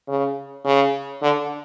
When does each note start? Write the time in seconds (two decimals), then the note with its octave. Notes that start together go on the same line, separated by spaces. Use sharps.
0.08 C#3
0.65 C#3
1.22 D3